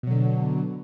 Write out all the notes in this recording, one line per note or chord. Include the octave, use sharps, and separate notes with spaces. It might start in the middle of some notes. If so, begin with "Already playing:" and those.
B2 D3 F#3